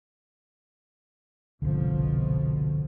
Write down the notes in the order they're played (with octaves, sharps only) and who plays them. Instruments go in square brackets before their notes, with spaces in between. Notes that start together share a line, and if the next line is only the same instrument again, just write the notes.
[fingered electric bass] G1 C2 [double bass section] B2 F3 [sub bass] D3